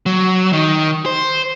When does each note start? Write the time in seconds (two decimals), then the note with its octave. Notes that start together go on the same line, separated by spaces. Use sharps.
0.06 F#3
0.53 D#3
1.06 C5